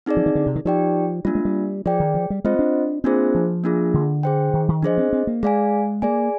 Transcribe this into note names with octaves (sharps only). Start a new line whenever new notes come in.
C4 D#4 G#4 D5
F3
D#3
D3
C3
D#3
F3 D#4 G4 D5 G5
G3 A#3 D4 F4
G#3
G3
F3 G#4 D5 G5
D#3
F3
G3
G#3 C4 F4 C5 D#5
D4
A#3 C4 D4 F4 G#4 C5
F3
A#3 D4 F4 G#4
D3
G#4 C5 G5
D#3
D#3
F3 D4 G#4 C5 D#5
C4
C4
A#3
G#3 G#4 D5 F5 G#5
A#3 G#4 D5 G#5